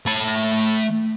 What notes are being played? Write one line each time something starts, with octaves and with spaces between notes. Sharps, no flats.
A3 B5